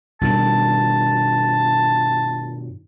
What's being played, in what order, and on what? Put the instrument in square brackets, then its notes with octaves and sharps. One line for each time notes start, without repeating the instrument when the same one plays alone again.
[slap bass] G2 B2 D#3 [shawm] A5